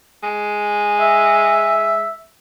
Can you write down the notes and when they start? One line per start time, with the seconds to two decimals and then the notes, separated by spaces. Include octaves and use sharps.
0.23 G#3
1.01 E5